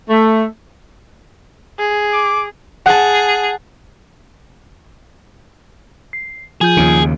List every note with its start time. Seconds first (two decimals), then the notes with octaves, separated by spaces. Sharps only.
0.10 A3
1.79 G#4
2.13 D6
2.86 G#4 F#5 A5
6.13 C7
6.61 F3 F4 G#4 G6
6.77 D#2 C#3